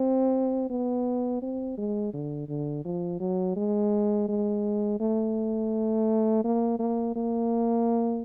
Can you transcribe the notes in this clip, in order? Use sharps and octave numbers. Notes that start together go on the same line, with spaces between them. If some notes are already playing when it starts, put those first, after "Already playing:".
Already playing: C4
B3
C4
G#3
D3
D3
F3
F#3
G#3
G#3
A3
A#3
A#3
A#3